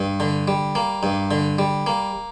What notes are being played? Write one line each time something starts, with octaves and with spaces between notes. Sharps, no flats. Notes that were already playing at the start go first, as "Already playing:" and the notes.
Already playing: G2
D3
G3
A#3
G2
D3
G3
A#3